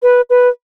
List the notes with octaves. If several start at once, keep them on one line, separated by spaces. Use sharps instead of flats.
B4
B4